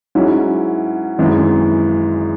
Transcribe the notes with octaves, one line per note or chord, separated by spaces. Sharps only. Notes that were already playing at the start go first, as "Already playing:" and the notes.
G#2 F#3 C#4 E4
G#1 F#2 E3 G#3